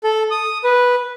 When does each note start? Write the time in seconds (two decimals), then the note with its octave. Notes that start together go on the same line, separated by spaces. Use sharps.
0.04 A4
0.31 D#6
0.64 B4